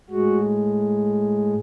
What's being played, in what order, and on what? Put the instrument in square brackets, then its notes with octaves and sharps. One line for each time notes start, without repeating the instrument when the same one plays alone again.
[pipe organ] A2 G#3 F#4